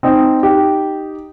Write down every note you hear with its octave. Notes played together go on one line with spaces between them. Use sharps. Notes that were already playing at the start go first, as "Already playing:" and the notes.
C4 D#4
D#4 G4